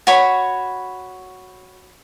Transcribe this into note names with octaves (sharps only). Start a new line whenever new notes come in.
F#4 C#5 B5